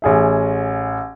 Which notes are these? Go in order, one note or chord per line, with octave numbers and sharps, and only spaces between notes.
A1 G#4 E5